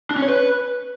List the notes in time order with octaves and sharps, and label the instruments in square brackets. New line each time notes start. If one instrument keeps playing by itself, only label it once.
[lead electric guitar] D4
C#4
C#5
B4